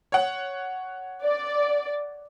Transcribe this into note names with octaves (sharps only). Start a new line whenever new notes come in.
C#5 F#5
D5